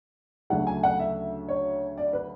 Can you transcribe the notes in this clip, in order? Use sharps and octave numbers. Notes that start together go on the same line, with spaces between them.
D2 C#3 F#3 A3 F#5
G#5
F#5
E5
C#5
D5
B4